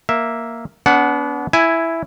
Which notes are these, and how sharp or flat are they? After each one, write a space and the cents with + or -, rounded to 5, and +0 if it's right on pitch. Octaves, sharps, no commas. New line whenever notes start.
A#3 +0 E5 +0
B3 +0 D4 -40 F#5 +0
E4 +0 G#5 +0